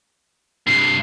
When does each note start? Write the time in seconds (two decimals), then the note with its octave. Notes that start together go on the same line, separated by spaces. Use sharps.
0.67 G2 C3 C7